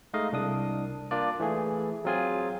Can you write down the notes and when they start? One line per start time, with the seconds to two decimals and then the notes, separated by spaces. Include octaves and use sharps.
0.13 G#3 A3 D#4 D#5 F5
0.32 C2 D4 D#6
1.11 A#3 D4 F4 D5
1.40 E3 A3 G#4
2.05 F#3 C4 F4 G#4 G#5